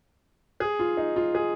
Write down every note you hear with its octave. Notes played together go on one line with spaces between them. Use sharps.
G#4
F4
D#4
F4
G#4